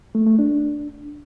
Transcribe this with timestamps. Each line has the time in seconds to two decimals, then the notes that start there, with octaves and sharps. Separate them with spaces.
0.15 A3
0.27 A3
0.39 D4